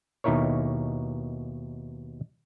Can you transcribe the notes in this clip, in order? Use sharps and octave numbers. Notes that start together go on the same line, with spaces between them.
D#2 B2 D#4 E4 A#4 C#5